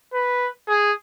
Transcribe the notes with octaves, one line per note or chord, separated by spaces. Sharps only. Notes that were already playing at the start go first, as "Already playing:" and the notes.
B4
G#4